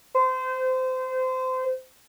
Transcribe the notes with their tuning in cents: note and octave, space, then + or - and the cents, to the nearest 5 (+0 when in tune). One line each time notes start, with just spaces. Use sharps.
C5 -25